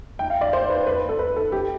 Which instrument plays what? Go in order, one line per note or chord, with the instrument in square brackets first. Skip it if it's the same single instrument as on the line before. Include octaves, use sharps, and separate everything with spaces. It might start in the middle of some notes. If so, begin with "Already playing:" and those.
[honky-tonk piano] G5
F5
D5
C5
B4
B4
A4
B4
A4
G4